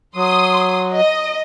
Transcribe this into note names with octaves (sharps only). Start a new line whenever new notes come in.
F#3 C6 D#6
D#5